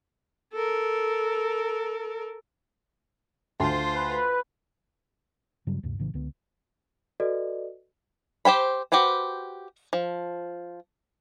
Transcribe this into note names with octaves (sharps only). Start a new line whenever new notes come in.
A4 A#4
D2 F4 C5 A5 C6
B4
G2 C#3 F#3 G3
D2 G2 C3
A#1 A2 C#3 E3
C#2 D3 B3
F#4 A4 B4 D5 D#5
G4 C5 G5 B5
F#4 G4 B4 C5 G5
F3